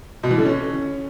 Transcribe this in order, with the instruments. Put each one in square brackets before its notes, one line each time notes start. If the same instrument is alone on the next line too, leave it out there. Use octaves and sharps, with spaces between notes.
[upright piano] B2
E3
D3
C#4